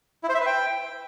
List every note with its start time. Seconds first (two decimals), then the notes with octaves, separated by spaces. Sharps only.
0.23 E4
0.29 C5
0.35 E5
0.41 B4
0.46 G5